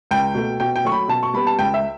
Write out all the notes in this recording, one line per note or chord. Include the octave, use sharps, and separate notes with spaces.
C#2 G5
B2 A3
B2 G5
G5
F#3 A3 C#6
B5
B2 A5
C#6
G3 B3 B5
A5
C#2 G5
E5